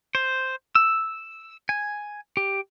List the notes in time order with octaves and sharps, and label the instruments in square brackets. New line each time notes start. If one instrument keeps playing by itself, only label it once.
[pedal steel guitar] C5
E6
G#5
G4